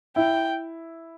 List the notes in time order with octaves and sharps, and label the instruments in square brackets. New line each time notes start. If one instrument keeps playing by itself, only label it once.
[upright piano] E4 [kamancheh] G5